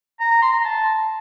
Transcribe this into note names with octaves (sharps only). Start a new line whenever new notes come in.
A#5
A#5
C6
A#5
A5